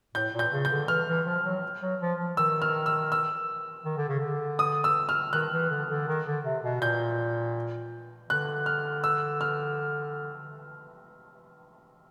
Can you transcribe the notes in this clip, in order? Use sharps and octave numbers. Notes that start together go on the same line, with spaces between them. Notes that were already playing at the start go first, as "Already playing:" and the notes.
A2 G6
A#2
G6
C#3
G6
D3
E3 F6
E3
F3
F#3
F#3
F3
F3
D#3 E6
F6
E6
E6
D#3
D3
C#3
D3
D#6
E6
F6
D#3 F#6
E3
D3
D3
D#3
D3
C3
B2
A#2 G6
D3 F#6
F6
E6
F6